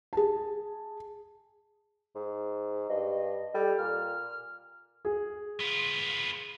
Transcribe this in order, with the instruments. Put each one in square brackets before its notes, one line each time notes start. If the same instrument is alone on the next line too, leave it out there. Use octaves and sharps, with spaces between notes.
[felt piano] G#4 A5
[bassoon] G#2
[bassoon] G2 [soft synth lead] D#5
[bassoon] G3 [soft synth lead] A4
[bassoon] A#2 [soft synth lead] F6
[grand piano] G#4
[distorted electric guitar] B3 F4